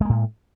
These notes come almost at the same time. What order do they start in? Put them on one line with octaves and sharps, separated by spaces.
G#3 A#3 A2